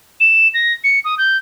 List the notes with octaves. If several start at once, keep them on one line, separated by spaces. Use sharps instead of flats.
E7
A#6
C#7
D#6
G6